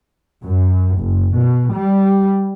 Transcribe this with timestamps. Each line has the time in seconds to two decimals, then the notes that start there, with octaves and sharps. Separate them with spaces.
0.44 F#2
0.98 F#1
1.35 B2
1.73 G3